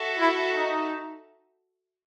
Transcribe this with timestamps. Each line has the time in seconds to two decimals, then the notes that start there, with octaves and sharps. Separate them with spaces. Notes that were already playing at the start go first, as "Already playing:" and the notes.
Already playing: F#4 A4 E5
0.19 E4
0.54 D#4